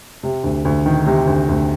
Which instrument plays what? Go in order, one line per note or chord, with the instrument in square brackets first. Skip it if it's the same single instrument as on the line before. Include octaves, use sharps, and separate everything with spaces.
[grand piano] C3
D2
D2
D#3
C3
D2
D2